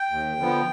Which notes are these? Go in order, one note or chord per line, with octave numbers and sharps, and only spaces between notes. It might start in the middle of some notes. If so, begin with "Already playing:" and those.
Already playing: G5
D#2
D3 F3 B3